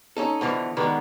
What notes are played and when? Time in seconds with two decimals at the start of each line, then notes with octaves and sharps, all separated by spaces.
0.17 C#4 D#4 A4
0.41 B2 D3 E3 F3
0.77 B2 D3 D#3 G#3 B3 B4